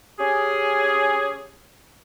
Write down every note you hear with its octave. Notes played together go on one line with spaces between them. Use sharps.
C#4 G4 G#4